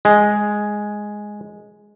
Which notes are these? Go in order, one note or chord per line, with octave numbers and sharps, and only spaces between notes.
G#3